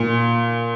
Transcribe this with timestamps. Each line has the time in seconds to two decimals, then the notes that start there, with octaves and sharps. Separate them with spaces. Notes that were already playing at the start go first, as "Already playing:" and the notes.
Already playing: A#2